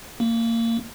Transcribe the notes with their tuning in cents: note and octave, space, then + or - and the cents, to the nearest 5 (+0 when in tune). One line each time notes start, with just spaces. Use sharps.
A#3 -25